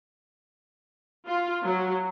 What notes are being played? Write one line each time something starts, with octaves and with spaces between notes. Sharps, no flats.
F4
F#3